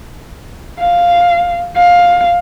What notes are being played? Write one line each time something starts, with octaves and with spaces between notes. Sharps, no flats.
F5
F5